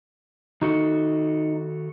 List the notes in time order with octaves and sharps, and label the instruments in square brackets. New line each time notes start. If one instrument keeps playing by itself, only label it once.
[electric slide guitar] D#3 F#4 A4 [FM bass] D#4